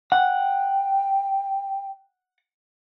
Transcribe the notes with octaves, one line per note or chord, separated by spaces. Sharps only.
F#5 G5